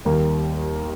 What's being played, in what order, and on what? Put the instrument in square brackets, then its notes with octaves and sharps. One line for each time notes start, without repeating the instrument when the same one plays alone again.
[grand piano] D#2 D#3 G3 A#3